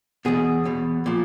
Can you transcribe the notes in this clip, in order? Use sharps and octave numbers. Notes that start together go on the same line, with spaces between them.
E2 B2 G#4
E2 B2
A#2 F3